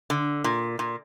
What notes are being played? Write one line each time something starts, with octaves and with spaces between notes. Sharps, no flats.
D3
A#2
A#2